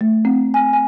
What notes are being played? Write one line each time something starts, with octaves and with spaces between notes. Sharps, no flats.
A3
C4
G#5
G#5